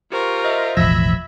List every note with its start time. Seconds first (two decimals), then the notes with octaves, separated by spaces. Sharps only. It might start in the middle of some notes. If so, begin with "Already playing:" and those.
0.12 F4 G4 A#4 C5 C#6
0.44 C5 D#5 E5
0.77 E1 A1 F3 E5 B5 E6 G#6 A#6